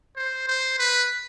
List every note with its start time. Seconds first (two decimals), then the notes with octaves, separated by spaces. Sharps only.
0.17 C5
0.48 C5
0.79 B4